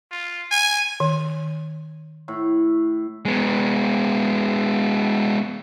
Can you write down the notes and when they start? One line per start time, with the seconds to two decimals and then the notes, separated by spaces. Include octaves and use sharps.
0.12 F4
0.51 G#5
1.00 D#3
2.28 A2
3.25 G#3 B3